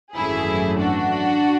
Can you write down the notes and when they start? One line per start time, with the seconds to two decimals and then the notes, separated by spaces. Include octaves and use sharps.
0.15 G#1 F#2 E3 A3 E4 G#4
0.79 D4 F#4